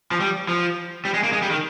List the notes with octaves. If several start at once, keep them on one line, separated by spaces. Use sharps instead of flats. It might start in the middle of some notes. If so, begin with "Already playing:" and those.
F3
G3
F3
G3
G#3
A#3
G#3
G3
D#3